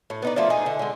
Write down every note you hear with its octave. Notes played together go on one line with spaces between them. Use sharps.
A2
B3 D#4 D5
F3 A3 A#3 D5
D#4 G#4
D3
D3 G#3